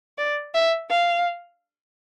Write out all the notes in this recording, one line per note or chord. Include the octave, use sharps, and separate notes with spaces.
D5
E5
F5